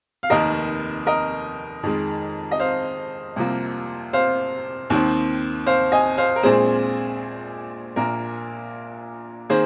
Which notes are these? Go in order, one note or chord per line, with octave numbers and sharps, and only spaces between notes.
F5
F1 D#2 D#3 A#4 D#5
A#4 D#5
F2 D#3 G#3
D#5
C5 F5
C2 C3 F3 A#3
C5 F5
D#2 D#3 C4
C5 F5
D#5 G#5
C5 F5
A#4
A#1 A#2 G#3 C4 G#4 C5
A#1 A#2 A#3 A#4
D#3 A#3 G#4 C5